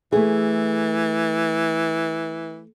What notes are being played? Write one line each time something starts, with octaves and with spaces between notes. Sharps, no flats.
E3 A3 G#4